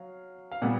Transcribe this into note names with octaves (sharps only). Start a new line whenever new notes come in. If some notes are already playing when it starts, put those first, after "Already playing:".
Already playing: F#3 F5
F5
A#2 G3 B3 F#5